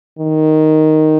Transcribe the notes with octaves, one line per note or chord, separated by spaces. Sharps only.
D#3